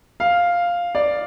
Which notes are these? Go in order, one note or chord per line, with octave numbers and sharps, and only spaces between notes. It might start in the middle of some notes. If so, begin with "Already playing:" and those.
F5
D5